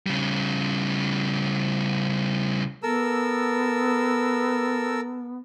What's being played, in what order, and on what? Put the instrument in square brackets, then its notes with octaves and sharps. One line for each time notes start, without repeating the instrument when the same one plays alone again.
[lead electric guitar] C#3 G3
[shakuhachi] B3 [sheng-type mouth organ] A4 A#4 E6